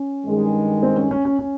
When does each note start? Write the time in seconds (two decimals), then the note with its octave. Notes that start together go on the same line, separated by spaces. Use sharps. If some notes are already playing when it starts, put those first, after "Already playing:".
Already playing: C#4
0.25 G2 D#3 G#3
0.83 C4
0.96 C#4
1.11 C#4
1.25 C#4
1.39 C#4